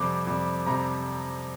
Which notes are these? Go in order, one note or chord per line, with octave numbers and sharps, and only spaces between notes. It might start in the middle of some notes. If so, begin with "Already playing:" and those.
Already playing: F2 C3 G3 D6
F2 C3 G3
F2 C3 G3 A#5